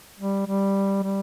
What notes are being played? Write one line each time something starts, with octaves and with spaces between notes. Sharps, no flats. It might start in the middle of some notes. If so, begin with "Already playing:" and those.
G3
G3
G3